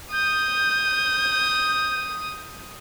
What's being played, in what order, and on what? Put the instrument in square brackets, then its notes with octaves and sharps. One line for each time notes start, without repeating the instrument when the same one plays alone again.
[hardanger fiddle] D#6 [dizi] G6